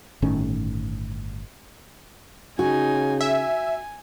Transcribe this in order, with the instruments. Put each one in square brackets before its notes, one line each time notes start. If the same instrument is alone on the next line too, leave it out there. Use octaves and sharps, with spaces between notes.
[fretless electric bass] G1 A2 D#3 C#4
[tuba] C#3 [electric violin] D#4 G#5 [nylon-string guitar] F#4
[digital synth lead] E5 [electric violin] G#5